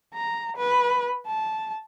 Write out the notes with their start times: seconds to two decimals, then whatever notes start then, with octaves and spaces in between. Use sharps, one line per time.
0.14 A#5
0.57 B4
1.26 A5